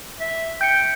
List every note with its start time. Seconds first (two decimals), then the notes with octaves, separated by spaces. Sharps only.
0.20 E5
0.61 G5 G6 C#7